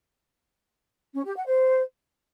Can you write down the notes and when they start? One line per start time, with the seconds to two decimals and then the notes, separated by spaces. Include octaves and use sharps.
1.14 C#4
1.25 G4
1.35 F#5
1.46 C5